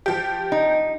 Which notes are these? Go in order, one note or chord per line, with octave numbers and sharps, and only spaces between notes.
F3 G4
D#4